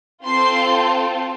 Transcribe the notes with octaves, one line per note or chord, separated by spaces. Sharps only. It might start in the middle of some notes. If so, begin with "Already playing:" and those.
C4 F4 A4 C6